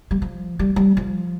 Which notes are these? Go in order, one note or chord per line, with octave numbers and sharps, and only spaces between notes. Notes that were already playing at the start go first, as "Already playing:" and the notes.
G3
F3
G3
G3
F3